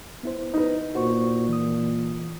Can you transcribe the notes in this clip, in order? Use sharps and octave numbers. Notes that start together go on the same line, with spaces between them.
B3 E4 C5
D#4 B4
A#2 F#4 C5 C#6
E3 D#6